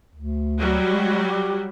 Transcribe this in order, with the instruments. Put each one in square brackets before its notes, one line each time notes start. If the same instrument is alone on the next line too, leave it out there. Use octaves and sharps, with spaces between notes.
[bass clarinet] D2
[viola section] F#3 G3 F#4
[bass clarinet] G#3
G4